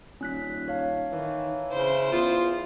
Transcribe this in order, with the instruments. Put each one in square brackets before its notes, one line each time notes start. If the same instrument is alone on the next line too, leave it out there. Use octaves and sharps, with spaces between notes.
[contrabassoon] D#1 [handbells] C#4 F#6 B6
[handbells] C#5 F5 A5
[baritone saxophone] D#3 [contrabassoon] E3
[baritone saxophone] C#3 [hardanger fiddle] E4 C5
[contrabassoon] E2 [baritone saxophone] F4